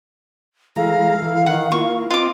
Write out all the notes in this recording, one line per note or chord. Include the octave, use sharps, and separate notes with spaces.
E3 G#3 A4 F5 A#5
E3
D#3 F#5
A#3 E4 F4 C#6
C4 F4 D#5 D6